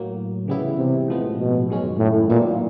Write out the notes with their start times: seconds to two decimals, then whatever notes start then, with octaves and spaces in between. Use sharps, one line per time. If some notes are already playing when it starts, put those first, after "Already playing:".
Already playing: A2 F#3 A#3
0.47 C#3 E3 G3 B3 E4
0.78 C3
1.08 A2 F3 G#3 B3
1.39 B2
1.68 F#2 D#3 G#3 C#4
1.98 A2
2.29 A#2 D#3 F#3 B3 E4